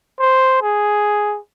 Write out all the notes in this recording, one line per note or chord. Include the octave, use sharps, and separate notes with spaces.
C5
G#4